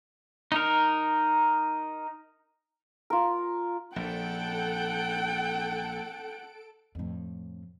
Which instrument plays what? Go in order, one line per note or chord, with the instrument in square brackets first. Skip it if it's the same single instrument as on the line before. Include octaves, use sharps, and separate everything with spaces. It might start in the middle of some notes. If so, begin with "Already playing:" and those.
[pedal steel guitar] D#4 A#4
[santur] F4 A#4
[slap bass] A#1 [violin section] A4 D7 [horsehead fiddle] F#5 [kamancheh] G5
[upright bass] F2 A2